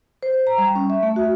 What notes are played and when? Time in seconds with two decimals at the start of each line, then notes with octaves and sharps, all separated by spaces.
0.23 C5
0.47 A#5
0.58 G3
0.75 C#4
0.90 E5
1.03 A3
1.16 F#4